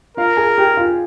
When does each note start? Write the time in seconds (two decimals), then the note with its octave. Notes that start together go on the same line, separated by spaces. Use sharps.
0.17 F4 A#4 F5
0.37 G#4 G#5
0.58 G4 G5
0.77 F4 F5